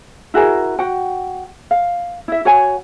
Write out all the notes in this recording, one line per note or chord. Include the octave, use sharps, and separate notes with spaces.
E4 F#4 G#4 A#4
F#4 F#5 G5
F5
E4 E5
F#4 C#5 F#5 G#5